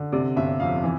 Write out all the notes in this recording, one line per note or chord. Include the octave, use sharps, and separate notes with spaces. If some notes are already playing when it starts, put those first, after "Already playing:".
Already playing: D3
C3 D5
G1 E5
F2 F5
E3